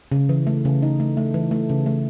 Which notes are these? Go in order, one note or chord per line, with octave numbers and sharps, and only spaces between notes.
C#3
E3
A3
C#3
D#4
A3
A3
E3
A3
C#3
A3